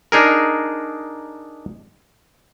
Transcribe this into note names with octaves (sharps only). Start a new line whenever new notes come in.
D4 D#4 G#4 A#4